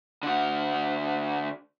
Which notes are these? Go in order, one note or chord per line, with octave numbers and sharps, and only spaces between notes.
D3 F#4